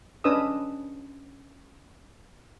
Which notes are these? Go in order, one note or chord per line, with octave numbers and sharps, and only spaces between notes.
C#4 D4 B4 D#5 D#6 E6